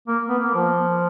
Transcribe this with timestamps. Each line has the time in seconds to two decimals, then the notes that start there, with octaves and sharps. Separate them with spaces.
0.08 A#3
0.29 B3
0.39 A#3
0.55 F3